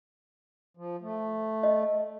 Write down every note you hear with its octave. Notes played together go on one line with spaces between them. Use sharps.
F3
A3
D#5